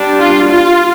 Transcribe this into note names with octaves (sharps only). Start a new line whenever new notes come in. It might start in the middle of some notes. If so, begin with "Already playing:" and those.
Already playing: G3 D4
F4
F4